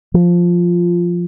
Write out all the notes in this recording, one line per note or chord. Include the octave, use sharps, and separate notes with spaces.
F3